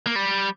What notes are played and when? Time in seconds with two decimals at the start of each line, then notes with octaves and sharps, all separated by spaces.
0.07 A#3
0.15 G3